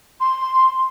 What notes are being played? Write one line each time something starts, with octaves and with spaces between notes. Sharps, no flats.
C6